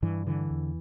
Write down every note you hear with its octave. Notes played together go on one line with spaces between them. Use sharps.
G2 E3
D3 E3
E2